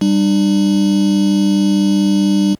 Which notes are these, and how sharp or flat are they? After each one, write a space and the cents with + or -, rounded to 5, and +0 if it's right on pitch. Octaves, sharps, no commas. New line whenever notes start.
G3 +0 D4 +40